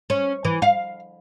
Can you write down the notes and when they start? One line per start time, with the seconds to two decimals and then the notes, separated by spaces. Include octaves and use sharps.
0.10 C#4
0.45 E3
0.62 F5